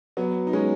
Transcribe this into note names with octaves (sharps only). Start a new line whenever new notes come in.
F#3 B3
D#4
G#3 C#4